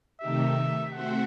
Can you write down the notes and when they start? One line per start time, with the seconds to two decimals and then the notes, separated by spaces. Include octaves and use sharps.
0.20 C3 D#3 A3 D#4 G4 E5
0.93 A3 C4 F#4 C5 E5 F#5